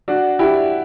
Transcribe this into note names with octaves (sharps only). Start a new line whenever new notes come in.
D4 F#4
E4 G4